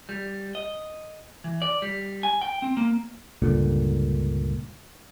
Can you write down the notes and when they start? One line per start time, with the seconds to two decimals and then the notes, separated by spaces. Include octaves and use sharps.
0.09 G3
0.55 D#5
1.44 E3
1.62 D5
1.82 G3
2.23 G#5
2.42 G5
2.62 C4
2.77 A#3
3.42 C#2 G2 A#2 D3